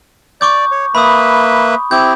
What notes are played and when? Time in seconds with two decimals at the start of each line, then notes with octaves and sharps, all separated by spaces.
0.41 D5 C#6 D6 G6
0.71 C#5
0.95 A#3 B4 E5 B5 D#6
1.91 C4 E4 G4 G6